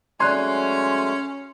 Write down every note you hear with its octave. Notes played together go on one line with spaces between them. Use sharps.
F#3 G#3 A3 C#4 D5 C6 F#6 G#6